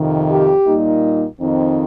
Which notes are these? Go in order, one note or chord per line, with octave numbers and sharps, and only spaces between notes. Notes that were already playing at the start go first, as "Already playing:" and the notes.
Already playing: F2 C3 D#3
G4
A#2 G3 A#3 D#4
F2 D#3 C4 D#4